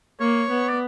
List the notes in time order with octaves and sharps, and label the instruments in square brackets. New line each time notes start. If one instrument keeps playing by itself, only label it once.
[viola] A#3 [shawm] C#5
[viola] B3
[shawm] D5